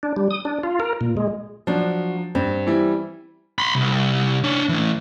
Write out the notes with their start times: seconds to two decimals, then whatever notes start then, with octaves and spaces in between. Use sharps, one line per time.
0.03 D4
0.16 G3
0.30 D#6
0.45 D4
0.63 F4
0.80 A#4
1.01 A#2
1.17 G#3
1.67 F3 F#3 D4
2.35 G2 C4
2.67 E3 G3 E4
3.58 B5 C6
3.75 C2
4.44 D4 C#5
4.69 A2 E3